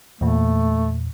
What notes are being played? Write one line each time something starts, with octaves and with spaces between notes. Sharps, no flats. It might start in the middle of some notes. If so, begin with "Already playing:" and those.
E2 A#2 A3